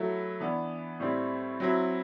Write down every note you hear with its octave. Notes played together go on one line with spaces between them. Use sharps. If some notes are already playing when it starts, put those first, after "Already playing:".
Already playing: F#3 A3 E4
E3 B3 D4
A2 G3 C4 E4
F#3 C4 E4